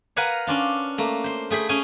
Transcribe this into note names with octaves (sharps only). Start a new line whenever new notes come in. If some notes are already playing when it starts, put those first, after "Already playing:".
A#4 B4 F5 F#5 G#5 A#5
C#4 D4 F4
A3 A#3
C5 C6
A3 G#4 G5 B5
C#4 G#4 G5 G#5